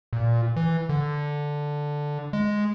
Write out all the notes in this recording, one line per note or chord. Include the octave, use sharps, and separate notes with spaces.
A#2
E3
D3
G#3